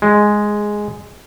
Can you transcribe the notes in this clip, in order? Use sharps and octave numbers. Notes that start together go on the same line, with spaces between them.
G#3